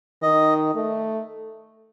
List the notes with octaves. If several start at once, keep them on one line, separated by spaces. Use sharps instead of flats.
D#3 D#5
A3